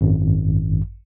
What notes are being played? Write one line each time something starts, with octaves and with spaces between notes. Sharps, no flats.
G#1 F#2